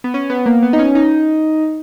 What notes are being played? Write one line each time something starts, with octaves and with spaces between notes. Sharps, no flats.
B3
C#4
B3
A#3
B3
D#4
C#4
D#4